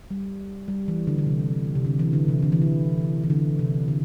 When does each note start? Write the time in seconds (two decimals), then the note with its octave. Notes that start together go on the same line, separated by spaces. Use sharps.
0.11 G3
0.68 G3
0.88 E3
1.07 D3
1.18 D3
1.26 C3
1.75 C3
1.85 D3
1.99 E3
2.13 D3
2.28 C3
2.43 D3
2.52 E3
2.62 D3
3.23 E3
3.30 D3
3.59 C3
3.88 D3